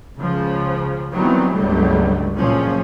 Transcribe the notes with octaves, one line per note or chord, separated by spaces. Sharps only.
C#2 C#3 F3
D#3 E3 F#3 G3 B3 C4
G1 C#2 D3 F#3 G3 A3
F#1 A#2 F3 C#4